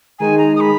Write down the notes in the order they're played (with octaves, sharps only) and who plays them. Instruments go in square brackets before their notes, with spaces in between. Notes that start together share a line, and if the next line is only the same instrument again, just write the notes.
[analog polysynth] D#3 G#3 D#4 G#4 [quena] G#5
[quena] A#5
D#6
B5